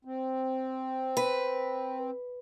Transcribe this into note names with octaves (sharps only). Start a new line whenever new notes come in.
C4
B4